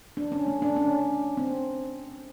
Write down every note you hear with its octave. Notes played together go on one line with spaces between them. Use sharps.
D4
C#4
A3
D4
C#4
C4